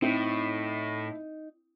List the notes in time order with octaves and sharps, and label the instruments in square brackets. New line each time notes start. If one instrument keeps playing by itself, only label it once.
[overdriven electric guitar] A2 [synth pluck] C4 [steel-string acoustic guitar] D#4 [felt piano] E4